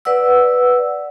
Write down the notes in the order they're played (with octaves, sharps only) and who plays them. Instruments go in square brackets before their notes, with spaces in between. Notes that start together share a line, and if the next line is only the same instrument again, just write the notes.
[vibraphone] B4 D5 F#5 E6